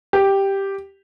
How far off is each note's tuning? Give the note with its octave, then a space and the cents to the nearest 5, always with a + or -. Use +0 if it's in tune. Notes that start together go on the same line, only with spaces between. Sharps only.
G4 +0